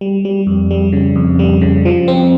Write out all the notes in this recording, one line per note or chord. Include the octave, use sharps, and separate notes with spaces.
G3
G3
F2
G3
C#3
F2
G3
C#3
F3
C4